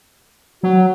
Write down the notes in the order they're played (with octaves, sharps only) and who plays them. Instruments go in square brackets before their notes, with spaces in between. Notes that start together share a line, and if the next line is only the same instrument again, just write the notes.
[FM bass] F#3 [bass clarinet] F#4